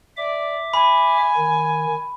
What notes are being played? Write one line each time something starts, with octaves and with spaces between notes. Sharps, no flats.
D5 E5 D6
G#5 B5
D#3